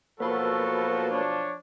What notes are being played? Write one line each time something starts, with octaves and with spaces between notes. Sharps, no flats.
B2 F3 F#3 A#3 F#4 A4 B4
D4 C#5